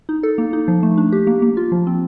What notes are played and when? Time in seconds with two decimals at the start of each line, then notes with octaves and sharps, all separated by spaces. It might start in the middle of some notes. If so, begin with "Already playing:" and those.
0.09 D#4
0.23 A4
0.38 A#3
0.53 D#4
0.68 F3
0.83 A3
0.97 D4
1.12 G4
1.27 A#3
1.42 A#3
1.57 F4
1.72 F3
1.87 C4